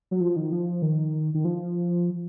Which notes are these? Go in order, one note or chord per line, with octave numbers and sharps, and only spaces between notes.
F#3
F3
D#3
F3
D#3
D#3
F3